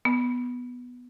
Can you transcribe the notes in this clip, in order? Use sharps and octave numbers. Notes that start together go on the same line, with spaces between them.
B3